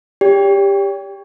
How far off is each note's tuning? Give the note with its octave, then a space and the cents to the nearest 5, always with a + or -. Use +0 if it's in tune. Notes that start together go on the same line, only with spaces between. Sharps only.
G4 +15 C#5 +45